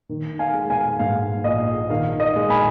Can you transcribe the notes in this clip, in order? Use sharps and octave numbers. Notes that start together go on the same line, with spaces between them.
D#3
F5 G#5
G#3
F5 G#5
G#2 F5
A#1 D#5
D#3 F5
D#5
G#3
G#5 B5